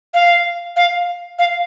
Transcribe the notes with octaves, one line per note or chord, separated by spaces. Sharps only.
F5
F5
F5